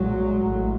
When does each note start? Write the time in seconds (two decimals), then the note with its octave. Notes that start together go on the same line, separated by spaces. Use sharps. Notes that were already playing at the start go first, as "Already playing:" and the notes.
Already playing: B1 A#2 F#3 G#3
0.35 A1 A2